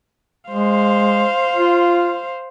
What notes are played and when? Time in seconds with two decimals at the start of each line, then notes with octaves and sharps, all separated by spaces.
0.50 G#3 C5 F5
1.55 F4